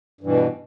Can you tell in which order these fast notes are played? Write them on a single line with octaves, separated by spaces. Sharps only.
G2 E3 B2